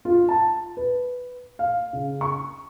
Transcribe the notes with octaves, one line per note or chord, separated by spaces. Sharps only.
F4
A5
B4
F5
C#3
C#6